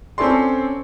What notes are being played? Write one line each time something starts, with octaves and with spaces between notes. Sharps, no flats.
C4 C#4 A4 D5 C6